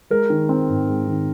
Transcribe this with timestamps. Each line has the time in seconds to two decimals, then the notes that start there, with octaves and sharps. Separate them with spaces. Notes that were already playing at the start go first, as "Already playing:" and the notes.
0.11 G#3 A#4
0.30 D#3
0.49 C4
0.69 G#2
0.88 G#3
1.08 D#3